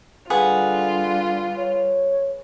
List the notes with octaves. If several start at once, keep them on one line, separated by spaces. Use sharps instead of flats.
D3 G3 F4 G#4 B4 F#5
C#5